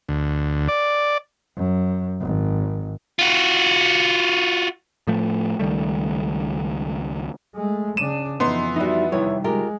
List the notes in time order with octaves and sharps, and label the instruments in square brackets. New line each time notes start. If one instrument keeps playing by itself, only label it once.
[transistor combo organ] D2
D5
[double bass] F#2
G#1
[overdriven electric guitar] F4 F#4
[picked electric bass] A2 F3 A3
C#2 D#3 G3 A3
[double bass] G#3 A3
[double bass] C#3 D4 [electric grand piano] D#7 E7
[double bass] F2 E3 [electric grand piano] B3 C6 [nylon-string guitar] D#4 C5
[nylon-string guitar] G3 E4 [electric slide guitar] D#4 F#4
[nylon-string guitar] E2 E3 C#5 [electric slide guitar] C3 D#3 G3
[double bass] G#3 [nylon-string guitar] F4 G4 A#4